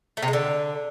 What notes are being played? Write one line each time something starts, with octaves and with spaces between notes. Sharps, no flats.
A3
C3
G#3
D3